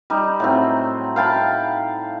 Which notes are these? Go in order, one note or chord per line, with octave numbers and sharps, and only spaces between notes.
G3 D#4
A2 F#3 C4
F5 G5 A5 B5